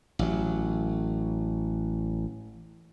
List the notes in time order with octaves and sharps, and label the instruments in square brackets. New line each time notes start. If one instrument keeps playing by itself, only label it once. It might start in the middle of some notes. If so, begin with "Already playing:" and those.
[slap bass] A1 F#3